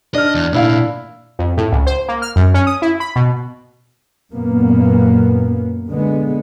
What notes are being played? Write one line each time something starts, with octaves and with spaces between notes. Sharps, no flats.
D4 D#5 F6
E2
A#2 A3 D4 E4 F5
F2
A2
C#2
C5
A#3
F6
F#2
C#4
D#6
E4
B5
B2
F#2 A#2 A#3 B3
D3 G#3 B3